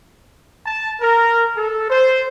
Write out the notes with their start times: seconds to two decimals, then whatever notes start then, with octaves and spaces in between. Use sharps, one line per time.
0.66 A5
1.01 A#4
1.57 A4
1.89 C5